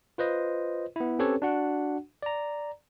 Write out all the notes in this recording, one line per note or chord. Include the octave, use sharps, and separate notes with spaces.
F4 B4 C5 D#5
B3 E4
C4 C#4 G4 A4 B4 C#5
D4 F#4 F#5
D5 A#5